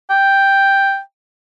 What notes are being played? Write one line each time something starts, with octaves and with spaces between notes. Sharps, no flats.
G5